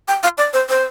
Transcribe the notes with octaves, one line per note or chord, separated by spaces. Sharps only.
G5
F5
D5
C5
C5